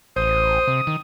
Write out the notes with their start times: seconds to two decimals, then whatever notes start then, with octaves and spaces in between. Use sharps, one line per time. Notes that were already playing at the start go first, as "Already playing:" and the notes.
0.16 A1 C5 D#6
0.67 C3
0.87 D#3